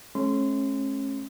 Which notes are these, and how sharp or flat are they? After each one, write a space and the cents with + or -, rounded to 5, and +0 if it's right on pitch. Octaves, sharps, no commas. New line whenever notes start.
A3 -40 C#4 -30 C6 -25